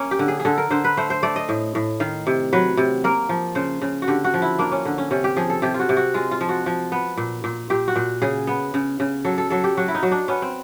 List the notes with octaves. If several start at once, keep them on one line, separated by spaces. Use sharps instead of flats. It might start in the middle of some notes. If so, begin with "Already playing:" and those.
Already playing: A#3 C#4
G4
D3
G#4
G#4
D3 A4
A#4
D3 C5
B4
A3 C5
C5
A3 D5
D#5
A2
A2
D#3 F5
C3
F#3 B4
C3
A#3 A#4
F3
C#3 C5
C#3
F#4
D3 G4
F#4
F3
E4
A#3 D4
C#4
D3
C#4
C3 C#4
G4
F3 G#4
A4
C3 G4
F4
F#4
C3
F#4
G#3 F4
F4
F3
F#4
F3
B3
A#2
A#2
A#2 G4
F#4
A#2
C#3 G#4
B3
C#3
C#3
F#3 A4
A4
F#3 A4
G4
F#3 F#4
E4
D#4
F#3
D4
B3 C#4
C4